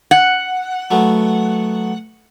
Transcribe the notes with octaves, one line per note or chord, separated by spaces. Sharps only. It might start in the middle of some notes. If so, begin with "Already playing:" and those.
F#5
F#3 A3 B3